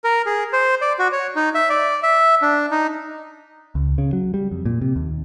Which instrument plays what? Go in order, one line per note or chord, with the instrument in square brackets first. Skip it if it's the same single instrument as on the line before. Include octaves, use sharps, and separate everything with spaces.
[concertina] A#4
G#4
C5
D5
F#4
C#5
D#4
E5
D5
E5
D4
D#4
[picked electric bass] C#2
C#3
F#3
G3
F2
A#2
C3
D#2